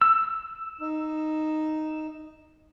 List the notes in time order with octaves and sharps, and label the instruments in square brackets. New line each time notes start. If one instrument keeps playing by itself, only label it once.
[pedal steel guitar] E6
[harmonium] D#4